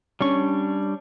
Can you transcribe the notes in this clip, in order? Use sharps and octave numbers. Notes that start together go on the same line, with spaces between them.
G3 C#4 D4 C#6